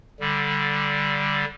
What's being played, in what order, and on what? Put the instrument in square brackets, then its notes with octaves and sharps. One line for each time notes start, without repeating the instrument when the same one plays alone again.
[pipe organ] D3 G3